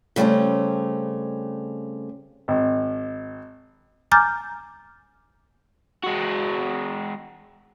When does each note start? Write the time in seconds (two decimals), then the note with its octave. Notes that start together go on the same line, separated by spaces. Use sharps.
0.16 C#3 G3 A3 C4 C#4
2.48 G#1
4.12 G#5 A#5 D6 F6 G6 A6
6.04 G#3 F#4